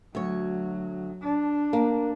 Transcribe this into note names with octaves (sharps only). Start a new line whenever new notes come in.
D2 F#3 C#5
D4
A#3